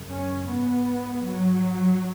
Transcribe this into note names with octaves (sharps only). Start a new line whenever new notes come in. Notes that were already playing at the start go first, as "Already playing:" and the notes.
Already playing: F#2 C#3
C#4
G#2 B3
F#3